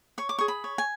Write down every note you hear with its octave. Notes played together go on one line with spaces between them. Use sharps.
C#5 C#6
D6
G#4 C#6
B5
C#5
G#5